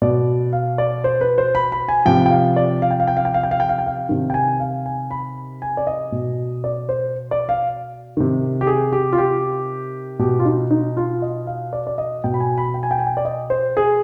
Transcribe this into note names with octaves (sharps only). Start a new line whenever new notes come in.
B2 D5
F5
D5
C5
B4
C5
B5
B5
G#5
C3 F3 G5
G5
F5
D5
F5
G5
F5
G5
F5
G5
F5
G5
F5
G5
F5
G5
F5
C3 D#3
G5
G#5
F5
G#5
B5
G#5
D5
D#5
B2
D5
C5
D5
F5
C3 D#3
G4
G#4
G4
F4
G4
B2 G4
F4
D#4
D#4
F4
D#5
F5
D5
D5
D#5
B2 G5
B5
G#5
B5
G5
G#5
G5
G#5
G5
D5
D#5
C5
G#4